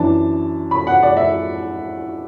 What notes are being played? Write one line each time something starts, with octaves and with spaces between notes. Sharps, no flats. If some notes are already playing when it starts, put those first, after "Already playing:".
Already playing: F#2 E3 D4 A5
B5
F#5
D5
E5